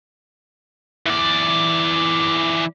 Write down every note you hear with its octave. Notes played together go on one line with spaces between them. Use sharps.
E3 D5